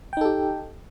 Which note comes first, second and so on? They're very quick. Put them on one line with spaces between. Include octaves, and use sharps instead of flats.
G5 D#4 A4 G4